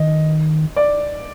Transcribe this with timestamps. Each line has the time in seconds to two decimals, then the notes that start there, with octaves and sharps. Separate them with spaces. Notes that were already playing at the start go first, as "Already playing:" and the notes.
Already playing: D#3 D#5
0.76 D5